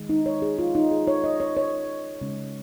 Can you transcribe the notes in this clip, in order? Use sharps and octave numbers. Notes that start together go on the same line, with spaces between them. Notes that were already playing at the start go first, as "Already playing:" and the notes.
Already playing: D#3 G#3
D#4
C#5
G#4
F4
D#4
G#4
C#5
D#5
C#5
C#5
C#3 G#3 C#4